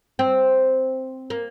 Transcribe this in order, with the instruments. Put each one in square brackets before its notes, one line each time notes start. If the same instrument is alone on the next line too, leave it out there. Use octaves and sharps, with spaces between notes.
[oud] C4
A#3